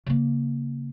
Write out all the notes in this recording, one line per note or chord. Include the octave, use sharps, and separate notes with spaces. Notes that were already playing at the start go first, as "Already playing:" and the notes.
C#3 A#3